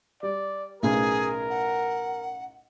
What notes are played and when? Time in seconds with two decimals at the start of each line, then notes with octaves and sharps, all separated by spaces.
0.23 G3 D5
0.83 B1 A2 C#3 G#4 A#4
1.50 F#5